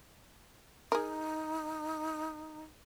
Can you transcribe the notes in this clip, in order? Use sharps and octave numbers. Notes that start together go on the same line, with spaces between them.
D#4 G#4 A#4